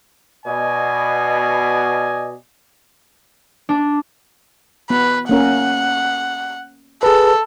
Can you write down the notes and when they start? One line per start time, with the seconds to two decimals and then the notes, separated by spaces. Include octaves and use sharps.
0.45 B2 D5 D#5 G#5
3.69 D4
4.90 B3 B4
5.29 A#3 C#4 A#4 F#5
7.03 G#4 A4 B4